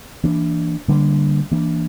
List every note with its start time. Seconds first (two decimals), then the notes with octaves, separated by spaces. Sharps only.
0.24 E3 A#3 D4
0.88 D3 G3 A#3 D4
1.52 E3 A#3 D4